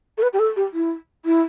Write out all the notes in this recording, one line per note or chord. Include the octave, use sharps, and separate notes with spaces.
A4
B4
G4
A4
G4
E4
E4